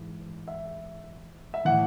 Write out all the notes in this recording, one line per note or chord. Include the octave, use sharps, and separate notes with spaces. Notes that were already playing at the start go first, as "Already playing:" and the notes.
Already playing: G#2 E3
E5
E5
A2 E3 F#5